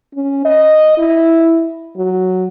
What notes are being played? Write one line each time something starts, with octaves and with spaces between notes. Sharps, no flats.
C#4
D#5
E4
F#3